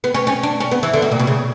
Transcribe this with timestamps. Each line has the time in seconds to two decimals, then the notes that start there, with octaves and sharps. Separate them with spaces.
0.04 B3
0.14 C#4
0.27 C#4
0.43 D4
0.60 C#4
0.71 B3
0.83 E3
0.94 D3
1.02 B2
1.12 A#2
1.19 B2
1.27 C#3